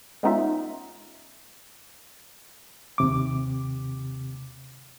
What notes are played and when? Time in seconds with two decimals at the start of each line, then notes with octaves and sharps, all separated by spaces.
0.23 G#3 B3 C#4 D#4 F4 E5
2.98 D#2 C3 D6